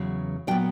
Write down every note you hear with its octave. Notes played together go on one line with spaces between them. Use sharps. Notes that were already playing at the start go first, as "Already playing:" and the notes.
Already playing: E2 C#3 F#3
A#2 F#3 B3 G5